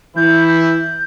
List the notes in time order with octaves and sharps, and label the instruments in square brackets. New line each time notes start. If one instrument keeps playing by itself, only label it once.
[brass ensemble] E3 E4 [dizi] G6
[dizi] G6